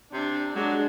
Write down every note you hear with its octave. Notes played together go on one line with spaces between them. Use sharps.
C3 D4
F#3 G#3 D4